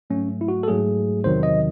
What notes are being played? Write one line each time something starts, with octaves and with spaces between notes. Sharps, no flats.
G#2 F#3 A3 C#4
E4
F#4
A4
G#2 F#3 A3 G#4
E2 C3 D#3 F#3 C5
D#5